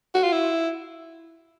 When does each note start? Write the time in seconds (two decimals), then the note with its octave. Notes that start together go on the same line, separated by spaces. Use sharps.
0.14 F#4
0.24 F4
0.33 E4